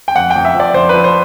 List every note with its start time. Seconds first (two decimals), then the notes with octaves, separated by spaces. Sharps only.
0.08 G5
0.15 F2 F#5
0.30 G5
0.36 F2
0.45 E5
0.55 F3
0.60 D5
0.74 F2 C5
0.89 F3 B4
1.04 C5